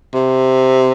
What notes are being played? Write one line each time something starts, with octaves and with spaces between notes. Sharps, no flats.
C3